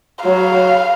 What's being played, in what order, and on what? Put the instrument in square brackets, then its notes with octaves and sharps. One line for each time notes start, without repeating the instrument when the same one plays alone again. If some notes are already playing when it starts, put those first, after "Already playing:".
[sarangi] F#3 [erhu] F5